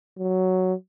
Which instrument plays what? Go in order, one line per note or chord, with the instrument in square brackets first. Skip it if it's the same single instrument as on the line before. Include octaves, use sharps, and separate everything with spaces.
[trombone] F#3